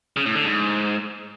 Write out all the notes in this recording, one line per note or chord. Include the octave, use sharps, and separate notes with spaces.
C#3
A2
D3
G#2